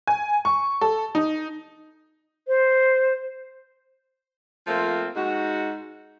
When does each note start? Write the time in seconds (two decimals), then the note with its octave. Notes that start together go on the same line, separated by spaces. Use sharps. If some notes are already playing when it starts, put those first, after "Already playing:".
0.07 G#5
0.45 C#6
0.81 A4
1.15 D#4
2.48 C5
4.67 F3 A3 A#3 C4 F4
5.16 G#2 D#4 F#4